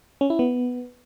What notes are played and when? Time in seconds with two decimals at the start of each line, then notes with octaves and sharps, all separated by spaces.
0.21 C#4
0.30 E4
0.39 B3